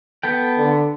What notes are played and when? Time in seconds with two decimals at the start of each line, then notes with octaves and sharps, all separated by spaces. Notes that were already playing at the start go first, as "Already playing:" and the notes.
0.23 B3 A4 G5
0.57 D3